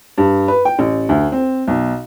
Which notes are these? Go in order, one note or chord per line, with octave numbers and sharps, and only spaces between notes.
G2
B4
G5
A1
D2
C4
B1